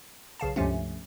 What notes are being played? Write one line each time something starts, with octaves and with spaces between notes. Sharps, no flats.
B1 C#3 F5 A5
C#2 G2 C3 F3 A3 C#4